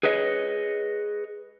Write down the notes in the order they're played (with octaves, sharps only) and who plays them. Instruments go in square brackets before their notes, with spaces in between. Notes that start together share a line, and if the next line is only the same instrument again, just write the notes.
[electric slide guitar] G#4 B4 C#5 D#5